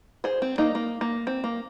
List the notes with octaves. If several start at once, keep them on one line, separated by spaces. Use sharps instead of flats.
G#4 C5
C4
A#3 D#4
A#3
A#3
C4
A#3